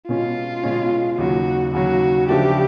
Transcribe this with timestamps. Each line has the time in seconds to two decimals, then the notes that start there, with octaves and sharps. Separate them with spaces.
0.08 B2 G#3 C#4 F4
0.63 B2 G#3 C#4
1.18 D#2 C#3 F#3 F#4
1.73 D#2 C#3 F#3 F#4
2.28 C#3 F3 A3 D4 G4